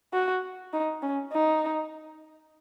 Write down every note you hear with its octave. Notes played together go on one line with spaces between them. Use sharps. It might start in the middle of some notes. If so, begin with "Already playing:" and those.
F#4
D#4
C#4
D#4